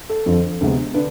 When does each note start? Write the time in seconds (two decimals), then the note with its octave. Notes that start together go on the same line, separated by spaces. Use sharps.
0.10 A4
0.26 F2 D3 F3
0.61 D2 C3 G#3 B3
0.94 D3 D4 B4